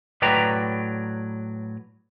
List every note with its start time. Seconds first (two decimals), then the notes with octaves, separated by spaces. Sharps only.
0.22 A2 F#3 B4 D5 G5 A#5